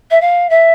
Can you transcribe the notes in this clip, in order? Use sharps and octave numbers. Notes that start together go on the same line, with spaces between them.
E5
F5
E5